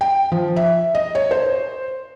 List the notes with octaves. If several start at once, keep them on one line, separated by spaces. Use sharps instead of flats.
G5
F3
E5
D#5
C#5
C5